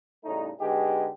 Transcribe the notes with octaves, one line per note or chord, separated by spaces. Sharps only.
A2 C#3 G3 A3 D#4
D3 G#3 B3 D#4 G4 G#4